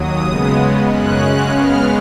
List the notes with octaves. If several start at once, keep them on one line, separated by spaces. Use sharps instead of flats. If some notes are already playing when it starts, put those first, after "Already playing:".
Already playing: D#2 F#3 D#6
C#3 G#3 B3
F#2 C#3 G#3 C#4 F#6
C#3 G#3 B3 F6